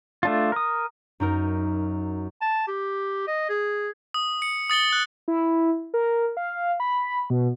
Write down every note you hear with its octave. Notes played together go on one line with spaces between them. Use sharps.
A3 D4 F4
A#4 D#6
F#2 D#4 A#4
A5
G4
D#5
G#4
D#6
C#7
D#6 A6 C#7 G7
F#6
E4
A#4
F5
B5
B2